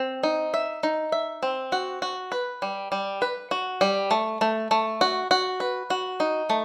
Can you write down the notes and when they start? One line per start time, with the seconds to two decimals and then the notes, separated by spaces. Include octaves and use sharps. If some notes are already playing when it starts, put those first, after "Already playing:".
Already playing: C4
0.23 D#4
0.54 E5
0.83 D#4
1.12 E5
1.43 C4
1.72 F#4
2.02 F#4
2.32 B4
2.62 G3
2.92 G3
3.22 B4
3.51 F#4
3.81 G3
4.11 A3
4.41 A3
4.71 A3
5.01 F#4
5.31 F#4
5.60 B4
5.90 F#4
6.20 D#4
6.50 A3